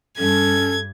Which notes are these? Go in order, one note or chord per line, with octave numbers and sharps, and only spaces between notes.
G2 C#4 A4 G#6